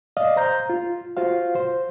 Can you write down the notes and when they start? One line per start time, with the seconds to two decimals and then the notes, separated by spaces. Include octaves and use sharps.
0.17 D5 D#5 F5
0.36 C5 A#5 G6
0.70 F4
1.17 F4 F#4 C5 F5
1.55 C5